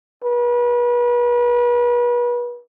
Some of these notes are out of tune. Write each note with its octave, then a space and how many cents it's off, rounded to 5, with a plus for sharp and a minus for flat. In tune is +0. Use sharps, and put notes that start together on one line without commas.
B4 -35